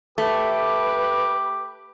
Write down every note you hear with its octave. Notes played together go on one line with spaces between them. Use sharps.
A3 G4 B4 D6